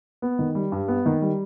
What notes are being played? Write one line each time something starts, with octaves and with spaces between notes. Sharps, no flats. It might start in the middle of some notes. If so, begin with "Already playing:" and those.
B3
D#3
G3
G2
B3
D#3
G3